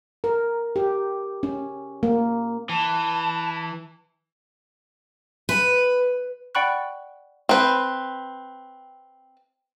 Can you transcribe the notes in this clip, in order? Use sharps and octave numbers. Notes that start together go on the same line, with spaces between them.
A#4
G4
C#4
A#3
E3 A5
B4
D5 F#5 G5 B5 C#6 F#6
C4 B4